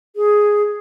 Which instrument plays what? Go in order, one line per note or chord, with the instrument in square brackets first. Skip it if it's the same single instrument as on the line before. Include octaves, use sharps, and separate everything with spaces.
[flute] G#4